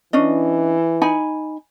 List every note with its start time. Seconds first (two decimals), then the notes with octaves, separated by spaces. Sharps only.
0.13 E3 C#4 D4 D#5
1.02 D#4 G#5 B5